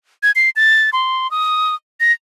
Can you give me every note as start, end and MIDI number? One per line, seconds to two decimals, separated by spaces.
0.23 0.31 92
0.36 0.50 96
0.56 0.90 93
0.93 1.30 84
1.31 1.75 87
2.00 2.12 94